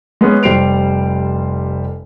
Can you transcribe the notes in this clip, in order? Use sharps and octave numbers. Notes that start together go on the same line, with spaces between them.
G#3 B3 C#4
F1 G3 C5 C7 D7 F7